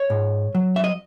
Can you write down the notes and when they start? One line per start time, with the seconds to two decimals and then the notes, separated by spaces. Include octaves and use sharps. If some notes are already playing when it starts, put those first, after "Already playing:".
Already playing: C#5
0.10 G#2
0.55 F#3
0.76 E5
0.84 D#5